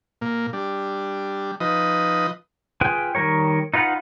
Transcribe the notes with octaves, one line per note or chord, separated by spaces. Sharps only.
A#2 A#3
G3 D4
F3 D#4 B4 D#5
F4 G#4 B4 G5 G#5
D#3 G3 A#4 C#5
D#4 F4 B4 F5 F#5